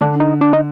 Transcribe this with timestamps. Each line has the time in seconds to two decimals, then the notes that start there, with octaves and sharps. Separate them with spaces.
0.01 D3 D4
0.20 D#4
0.41 D4
0.53 D#4